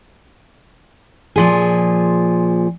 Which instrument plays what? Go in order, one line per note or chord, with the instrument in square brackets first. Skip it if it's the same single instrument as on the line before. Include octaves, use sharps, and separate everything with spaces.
[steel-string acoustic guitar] A#2 F3 G#4